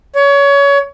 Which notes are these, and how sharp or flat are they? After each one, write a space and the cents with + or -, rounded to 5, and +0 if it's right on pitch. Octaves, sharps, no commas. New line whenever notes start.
C#5 +25